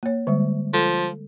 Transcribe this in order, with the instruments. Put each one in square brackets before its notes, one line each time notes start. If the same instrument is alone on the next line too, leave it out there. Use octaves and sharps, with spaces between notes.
[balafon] A#3 C#5
D3 G3 G#3
[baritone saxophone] F3 [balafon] A4